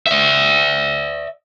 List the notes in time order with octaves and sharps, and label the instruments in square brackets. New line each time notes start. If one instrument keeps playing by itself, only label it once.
[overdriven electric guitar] D5 E5